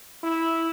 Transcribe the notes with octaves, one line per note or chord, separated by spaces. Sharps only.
E4